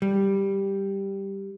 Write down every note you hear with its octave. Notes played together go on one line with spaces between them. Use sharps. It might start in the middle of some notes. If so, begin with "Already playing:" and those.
G3